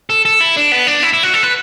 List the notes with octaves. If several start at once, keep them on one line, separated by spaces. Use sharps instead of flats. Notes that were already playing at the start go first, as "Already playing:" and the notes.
A4
A4
E4
D4
B3
D4
E4
E4
F#4
A4
B4